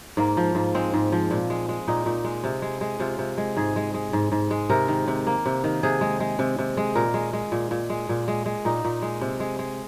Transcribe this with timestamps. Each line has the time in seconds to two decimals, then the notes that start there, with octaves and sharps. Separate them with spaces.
0.17 G#2 A#3
0.37 F3
0.55 G#2
0.75 G#3 C4
0.94 G#2
1.12 F3
1.31 A#2
1.50 G#3
1.69 G#3
1.88 A#2 D#4
2.06 A#2
2.24 G#3
2.44 C3
2.62 G#3
2.81 G#3
3.00 C3 F4
3.19 C3
3.38 G#3
3.57 G#2 G#4
3.76 G#3
3.94 G#3
4.13 G#2
4.32 G#2
4.51 G#3
4.70 C3 A#4
4.88 D#3
5.08 C3
5.27 A#3
5.46 C3
5.64 D#3
5.83 C3 G#4
6.01 G#3
6.20 G#3
6.39 C3
6.59 C3
6.77 G#3
6.95 A#2 A#4
7.14 G#3
7.33 G#3
7.52 A#2
7.71 A#2
7.90 G#3
8.09 A#2
8.28 G#3
8.46 G#3
8.65 A#2 D#4
8.85 A#2
9.02 G#3
9.21 C3
9.40 G#3
9.59 G#3